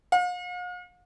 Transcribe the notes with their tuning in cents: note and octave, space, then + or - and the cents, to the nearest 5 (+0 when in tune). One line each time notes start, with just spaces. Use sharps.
F5 +45